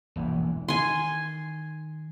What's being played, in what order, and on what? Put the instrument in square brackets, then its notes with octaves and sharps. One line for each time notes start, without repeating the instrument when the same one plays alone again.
[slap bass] E1 A#1 E3
[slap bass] D#3 [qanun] G#5 C6